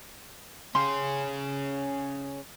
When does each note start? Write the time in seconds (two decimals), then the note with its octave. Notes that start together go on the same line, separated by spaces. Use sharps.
0.75 C#4 G4 G#4 F5 C6